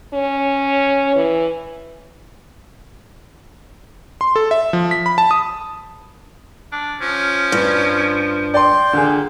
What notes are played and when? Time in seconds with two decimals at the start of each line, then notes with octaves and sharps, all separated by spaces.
0.14 C#4
1.16 E3
4.21 C6
4.36 A4
4.51 E5
4.73 F3
4.91 B6
5.06 B5
5.18 A5
5.31 D#6
6.72 D4
7.01 F3 C#4
7.52 G2
8.54 D5 G5 C6
8.93 A#2 D3 G#4